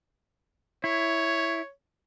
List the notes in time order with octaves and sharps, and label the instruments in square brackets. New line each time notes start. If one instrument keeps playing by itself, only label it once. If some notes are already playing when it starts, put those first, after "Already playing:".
[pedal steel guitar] E4 [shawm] C#5